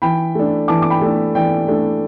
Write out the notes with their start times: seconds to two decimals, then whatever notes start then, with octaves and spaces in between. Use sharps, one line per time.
0.02 E3 G5 B5
0.35 A3 D4
0.68 E3 A5 D6
0.82 D6
0.90 G5 B5
1.02 A3 D4
1.35 E3 D5 G5
1.68 A3 D4